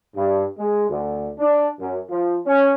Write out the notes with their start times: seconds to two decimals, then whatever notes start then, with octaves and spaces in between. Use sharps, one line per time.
0.16 G2
0.58 G#3
0.90 D2
1.39 D4
1.80 F#2
2.10 F3
2.46 C#4